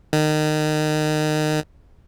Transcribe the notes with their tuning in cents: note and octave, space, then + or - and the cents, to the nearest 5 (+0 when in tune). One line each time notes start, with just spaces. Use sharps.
D#3 -25